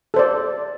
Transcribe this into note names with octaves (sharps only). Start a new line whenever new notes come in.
A4 C5 D5